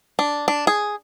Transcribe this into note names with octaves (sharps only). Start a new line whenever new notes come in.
D4
D4
G#4